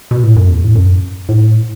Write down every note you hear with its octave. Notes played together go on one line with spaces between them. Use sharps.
B2
A2
F#2
E2
A2
F#2
A2